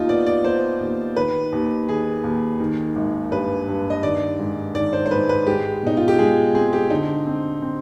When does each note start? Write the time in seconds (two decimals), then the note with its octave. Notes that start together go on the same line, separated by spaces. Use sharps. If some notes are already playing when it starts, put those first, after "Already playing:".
Already playing: D#2 D#4 F4
0.09 B3 D5
0.27 D5
0.44 B3 C5
0.81 D#2
1.16 D#3 B4
1.52 D#2
1.88 D#3 G#4
2.24 D#2
2.60 D#3
2.96 G#1
3.31 G2 B4
3.68 G2
3.90 D#5
4.03 D#3 D5
4.39 G#2
4.75 D#3 D5
4.93 C5
5.06 C5
5.11 G#2 B4
5.29 B4
5.47 G#3 G4
5.83 B2 D#4
5.97 F4
6.08 G4
6.19 G#3 G#4
6.54 C4 G#4
6.73 G4
6.90 D3 D#4
7.26 C4
7.62 C4